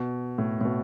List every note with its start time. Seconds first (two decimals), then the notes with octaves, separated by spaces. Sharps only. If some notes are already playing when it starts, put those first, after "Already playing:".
Already playing: B2
0.38 A2
0.61 A2
0.65 B2